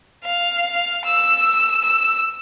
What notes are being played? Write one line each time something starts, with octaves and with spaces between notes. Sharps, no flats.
F5
E6
E6